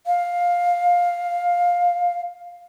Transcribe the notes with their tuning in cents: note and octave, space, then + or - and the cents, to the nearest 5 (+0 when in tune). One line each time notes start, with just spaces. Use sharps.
F5 +10